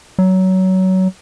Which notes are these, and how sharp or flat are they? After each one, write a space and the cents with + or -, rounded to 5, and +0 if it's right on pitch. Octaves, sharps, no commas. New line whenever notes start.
F#3 +20